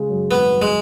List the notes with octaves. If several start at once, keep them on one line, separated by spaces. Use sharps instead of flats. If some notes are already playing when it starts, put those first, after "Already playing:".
Already playing: C#3 G#3
F#2
G#1 B3
F#2
G#3